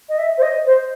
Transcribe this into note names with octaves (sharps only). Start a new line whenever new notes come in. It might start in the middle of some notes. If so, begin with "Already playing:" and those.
D#5
E5
C5
D#5
C5